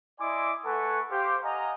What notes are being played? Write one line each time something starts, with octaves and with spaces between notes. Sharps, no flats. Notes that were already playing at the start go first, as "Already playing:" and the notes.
E4 D5 D#5 G#5 C6 D6
A3 A4 B4 F#5 G#5 C#6
G4 C5 F5
D#5 F5 F#5 G#5 A#5